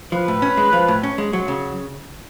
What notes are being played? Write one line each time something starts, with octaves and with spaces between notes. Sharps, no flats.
F3 B4
A2
C#4
G#3
F3
A2
C#4
G#3
F#3
C#3